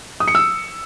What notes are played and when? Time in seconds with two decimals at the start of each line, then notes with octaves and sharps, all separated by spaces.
0.20 D#6
0.28 C#7
0.35 E6